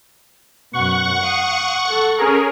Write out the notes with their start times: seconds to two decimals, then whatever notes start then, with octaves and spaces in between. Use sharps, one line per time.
0.73 F#2 B2 F#5 C#6
1.21 F5 D#6
1.88 A4
2.18 C#4 G#4 A#4